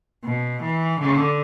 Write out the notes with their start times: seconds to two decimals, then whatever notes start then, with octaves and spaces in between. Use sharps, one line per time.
0.25 B2
0.63 E3
1.00 D3